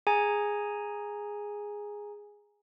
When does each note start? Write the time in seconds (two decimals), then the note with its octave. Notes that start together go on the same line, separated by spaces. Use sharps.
0.07 G#4 G#5 A#5